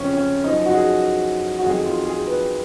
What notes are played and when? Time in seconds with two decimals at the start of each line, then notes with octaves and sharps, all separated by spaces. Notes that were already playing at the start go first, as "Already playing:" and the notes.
Already playing: F2 C#3 F3 C#4
0.13 C#4
0.44 F#2 F3 D#4
0.66 F#4
0.74 G#4
1.59 F#4
1.66 F2 D#3 F#3 G#4
1.85 F4
2.06 G#4
2.27 B4